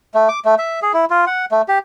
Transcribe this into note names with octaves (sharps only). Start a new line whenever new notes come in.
A3
D6
A3
E5
G#4
E4
F4
F#5
A3
G4